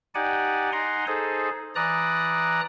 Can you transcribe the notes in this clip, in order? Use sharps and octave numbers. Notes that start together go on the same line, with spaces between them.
D#4 G4 D5 F#5 G#5
D#4 F#5 G#5 A#5 C6
D#4 G#4 A4 C5
E3 D5 A#5 D#6 F#6